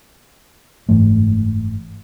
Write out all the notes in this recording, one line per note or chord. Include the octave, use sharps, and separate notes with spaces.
F#1 G#2 E3 A3